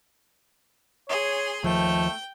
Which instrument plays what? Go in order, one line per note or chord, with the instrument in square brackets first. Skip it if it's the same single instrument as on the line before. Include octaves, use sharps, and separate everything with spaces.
[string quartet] G#4 C6 [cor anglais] C#5
[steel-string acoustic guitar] D#2 F3 [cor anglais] A3 [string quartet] G5